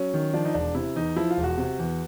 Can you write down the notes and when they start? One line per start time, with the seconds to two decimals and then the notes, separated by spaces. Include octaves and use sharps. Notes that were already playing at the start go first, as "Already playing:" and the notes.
Already playing: F#3 C#4
0.14 D#3
0.34 F3 D4
0.45 D#4
0.54 E1 D4
0.75 C3 E4
0.95 E2 D#4
1.16 F3 E4
1.31 F4
1.37 E1
1.44 F#4
1.58 C3
1.79 E2